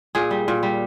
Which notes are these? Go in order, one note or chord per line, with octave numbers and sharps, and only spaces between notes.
A#2 G#4
G3
A#2
G3